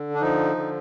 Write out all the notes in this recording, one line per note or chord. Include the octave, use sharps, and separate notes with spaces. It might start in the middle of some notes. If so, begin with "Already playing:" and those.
Already playing: D3
D4
F3 D#4
D3